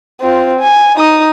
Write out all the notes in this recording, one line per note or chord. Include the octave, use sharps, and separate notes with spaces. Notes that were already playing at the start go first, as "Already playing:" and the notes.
C4 F4
G#5
D#4 D#6